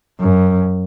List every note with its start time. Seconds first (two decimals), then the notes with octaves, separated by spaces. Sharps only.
0.20 F#2